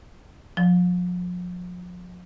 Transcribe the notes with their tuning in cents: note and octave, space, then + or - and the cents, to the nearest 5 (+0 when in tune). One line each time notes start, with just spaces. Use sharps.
F3 +40